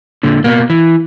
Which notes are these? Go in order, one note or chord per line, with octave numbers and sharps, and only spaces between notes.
A#2 D3
B2 A#3
E3